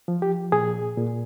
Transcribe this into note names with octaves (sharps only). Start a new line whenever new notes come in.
F3
G4
A#2 G#4
A#2